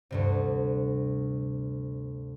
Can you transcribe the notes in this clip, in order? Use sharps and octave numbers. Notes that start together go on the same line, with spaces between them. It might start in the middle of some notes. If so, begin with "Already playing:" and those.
D2 G2 C3